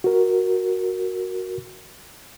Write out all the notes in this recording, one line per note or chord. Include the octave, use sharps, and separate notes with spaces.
F#4 A#4